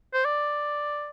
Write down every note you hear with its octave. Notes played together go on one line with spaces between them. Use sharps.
C5
D5